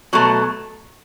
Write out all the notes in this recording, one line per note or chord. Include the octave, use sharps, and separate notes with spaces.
B2 F#3 A3